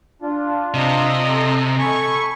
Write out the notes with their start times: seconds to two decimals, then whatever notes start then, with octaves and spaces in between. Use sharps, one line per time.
0.22 D4 F4
0.74 C3 D#5 A#5
1.27 A4
1.78 A4 G#5 B5 C#6